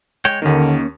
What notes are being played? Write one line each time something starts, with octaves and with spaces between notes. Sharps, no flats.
G#3 C#5 G5
D#2 D3 D#3 A#3 C#4